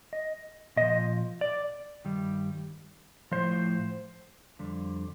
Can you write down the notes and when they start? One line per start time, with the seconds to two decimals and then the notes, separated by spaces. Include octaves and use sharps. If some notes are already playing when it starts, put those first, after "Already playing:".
0.13 D#5
0.76 A#2 F3 D#5
1.41 D5
2.05 G2 D#3 G3
3.32 A2 F3 C5
4.59 F2 D3 G3